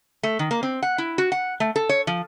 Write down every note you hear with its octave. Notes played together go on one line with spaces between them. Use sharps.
A3
D#3
A#3
C4
F#5
E4
F#4
F#5
A3
A4
C#5
F3